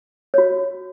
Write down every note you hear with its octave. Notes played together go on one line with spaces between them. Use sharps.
F#4 C#5